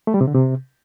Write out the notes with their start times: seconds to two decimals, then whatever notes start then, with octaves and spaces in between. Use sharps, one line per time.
0.07 A3
0.14 G3
0.21 C3
0.27 D3
0.34 C3